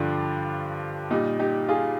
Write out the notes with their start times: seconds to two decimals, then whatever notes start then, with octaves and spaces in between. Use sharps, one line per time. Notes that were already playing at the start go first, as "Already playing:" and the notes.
Already playing: G2 D3 F3 D4 F4
1.11 A#2 G3 D#4
1.39 D#4 G4
1.69 F4 G#4